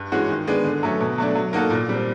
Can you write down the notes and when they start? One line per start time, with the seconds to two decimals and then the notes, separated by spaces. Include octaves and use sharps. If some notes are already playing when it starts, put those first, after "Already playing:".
Already playing: G2
0.12 E3 G#3 C#4 F#4
0.29 D#3
0.47 G#3 B3 D4
0.64 D3
0.83 F#3 A3 C#4
1.01 B2
1.18 F#3 A3 D4
1.35 F#3
1.53 A#3 D#4 F#4 A4
1.70 A#2
1.89 G3 C4